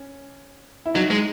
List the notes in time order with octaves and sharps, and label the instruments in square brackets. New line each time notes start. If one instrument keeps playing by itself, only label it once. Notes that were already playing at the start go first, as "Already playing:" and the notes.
Already playing: [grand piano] C#4
E4
[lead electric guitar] F#3 [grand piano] D#4
[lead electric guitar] G#3